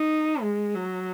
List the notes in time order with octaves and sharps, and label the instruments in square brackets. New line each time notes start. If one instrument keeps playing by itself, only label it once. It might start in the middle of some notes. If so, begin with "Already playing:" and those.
Already playing: [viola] D#4
G#3
F#3